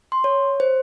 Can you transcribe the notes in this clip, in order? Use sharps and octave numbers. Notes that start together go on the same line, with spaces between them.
C6
C#5
C5